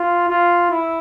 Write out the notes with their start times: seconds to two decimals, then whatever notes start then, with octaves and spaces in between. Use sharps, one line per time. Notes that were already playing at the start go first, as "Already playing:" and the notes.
Already playing: F4
0.29 F4
0.71 E4